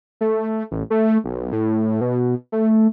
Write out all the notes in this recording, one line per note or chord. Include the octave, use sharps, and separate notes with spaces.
A3
A1
A3
B1
A2
B2
A3